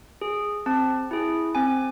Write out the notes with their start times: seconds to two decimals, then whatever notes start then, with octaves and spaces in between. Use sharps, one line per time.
0.21 G#4
0.66 C4 A5
1.11 E4 G#4
1.55 C4 G#5